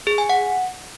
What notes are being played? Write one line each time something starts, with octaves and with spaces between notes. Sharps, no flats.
G#4
G#5
F#5